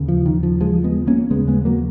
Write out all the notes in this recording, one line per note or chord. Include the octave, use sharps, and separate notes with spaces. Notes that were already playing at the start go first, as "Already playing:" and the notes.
Already playing: D#2 C#3
F3
D#3
F3
F3 G#3
G#3 B3
A#3 C#4
D#2 C#3 G#3 B3
G#3 B3
F#3 A#3